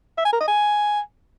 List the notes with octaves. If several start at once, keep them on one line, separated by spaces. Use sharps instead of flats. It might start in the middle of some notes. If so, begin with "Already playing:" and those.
E5
G#5
A#4
D#5
G#5